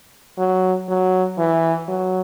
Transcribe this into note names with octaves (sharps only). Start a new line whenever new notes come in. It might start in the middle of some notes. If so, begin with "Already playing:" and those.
F#3
F#3
E3
F#3